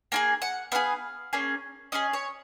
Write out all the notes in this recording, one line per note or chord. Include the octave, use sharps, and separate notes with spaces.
A#3 F4 G#4 G#5
F#5
B3 F4 G#4 F5
A#3 C#4 G#4
C#4 F4 G#4 D#5
C#5